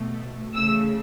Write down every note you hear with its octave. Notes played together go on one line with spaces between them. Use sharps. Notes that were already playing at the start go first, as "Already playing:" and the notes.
Already playing: B2 A3
C#3 E3 A3 E6